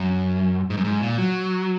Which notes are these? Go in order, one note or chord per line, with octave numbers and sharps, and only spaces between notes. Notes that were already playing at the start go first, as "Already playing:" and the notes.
Already playing: F#2
G#2
F#2
G#2
A#2
F#3